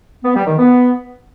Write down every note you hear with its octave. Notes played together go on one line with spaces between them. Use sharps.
B3
G3
D#3
B3